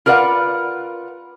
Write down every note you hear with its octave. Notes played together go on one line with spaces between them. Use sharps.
F4 A#4 B4 D5 F5 F#5